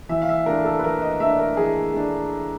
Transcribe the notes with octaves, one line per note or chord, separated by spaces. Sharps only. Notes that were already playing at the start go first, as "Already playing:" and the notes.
E3 E5
F5
E5
D4 A#4
A3
A4
B4
E3 A#4
D#5
A3 D4 E5
A#4
E3 G#4
A3 D4